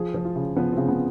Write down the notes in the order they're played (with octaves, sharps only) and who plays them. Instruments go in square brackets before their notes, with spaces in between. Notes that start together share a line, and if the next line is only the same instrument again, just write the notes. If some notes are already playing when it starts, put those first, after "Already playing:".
Already playing: [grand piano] F3 G#4
F3
F4
C#3
F3 B3
C#3 C4
B3